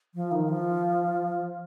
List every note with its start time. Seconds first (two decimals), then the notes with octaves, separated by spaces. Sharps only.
0.15 F3
0.32 D#3
0.49 F3